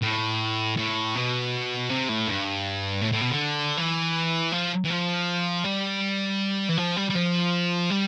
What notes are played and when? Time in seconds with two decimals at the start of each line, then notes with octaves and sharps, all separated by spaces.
0.02 A2
0.77 A2
1.15 B2
1.89 C3
2.09 A2
2.28 G2
3.02 A2
3.12 A2
3.21 B2
3.31 D3
3.77 E3
4.52 F3
4.85 E3
4.90 F3
5.64 G3
6.69 E3
6.77 F3
6.96 G3
7.10 G3
7.15 F3
7.90 G3